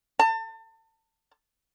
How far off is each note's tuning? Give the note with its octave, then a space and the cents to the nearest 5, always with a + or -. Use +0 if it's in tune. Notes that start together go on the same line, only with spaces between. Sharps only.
A5 +35